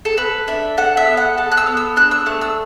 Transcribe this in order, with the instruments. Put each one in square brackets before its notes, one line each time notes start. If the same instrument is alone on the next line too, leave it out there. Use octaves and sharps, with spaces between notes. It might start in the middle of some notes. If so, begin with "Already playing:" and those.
[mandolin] A4
A4 B4
D4 E5
A4 F#5
E5
B3
F#5
A4 A5
F#6
E6
B3
E6
D4 F#6
E6
A3 F#6
E6